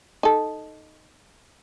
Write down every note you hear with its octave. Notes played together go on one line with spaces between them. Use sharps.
D#4 A4